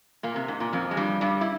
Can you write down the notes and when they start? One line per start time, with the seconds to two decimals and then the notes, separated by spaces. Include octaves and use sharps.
0.23 A#2 A#3
0.36 C3
0.48 G#2
0.60 A#2
0.73 F2 F3
0.91 G#3
0.97 G2 G3
1.21 G2 G3
1.41 E4